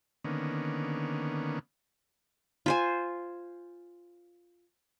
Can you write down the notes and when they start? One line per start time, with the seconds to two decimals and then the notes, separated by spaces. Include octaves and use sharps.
0.24 D3 D#3 A#3 B3 C#4
2.66 F4 C5 G#5